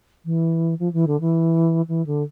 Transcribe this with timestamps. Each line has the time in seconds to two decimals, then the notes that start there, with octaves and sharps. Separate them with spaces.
0.25 E3
0.79 F3
0.93 E3
1.07 D3
1.20 E3
1.88 E3
2.06 D3